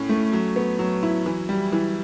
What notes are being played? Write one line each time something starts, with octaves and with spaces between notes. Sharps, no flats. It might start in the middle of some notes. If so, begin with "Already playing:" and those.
Already playing: A2 C#4
A3
F#3
B3
F#3
E4
E3
G3
E3